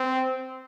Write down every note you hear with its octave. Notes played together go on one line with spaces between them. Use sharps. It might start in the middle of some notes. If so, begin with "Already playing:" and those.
Already playing: C4